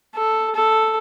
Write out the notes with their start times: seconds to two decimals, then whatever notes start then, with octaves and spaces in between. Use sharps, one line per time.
0.15 A4
0.55 A4